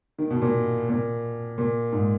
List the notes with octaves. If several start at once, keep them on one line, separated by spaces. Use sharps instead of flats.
D#3
B2
A#2
A#2
A#2
G#2